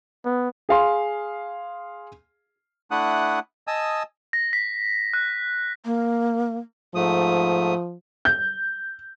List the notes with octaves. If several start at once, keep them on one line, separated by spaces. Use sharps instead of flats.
B3
G#4 F5 C6
A3 D4 E4 F#5 D#6 F#6
D#5 G#5 A5 D#6 E6
A#6
B6
F#6
A#3
G#2 F3 A3 D#6
G6